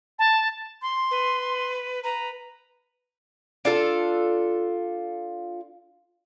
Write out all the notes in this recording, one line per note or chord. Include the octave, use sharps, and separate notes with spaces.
A5
C6
B4
B4 A#5
D4 F4 A4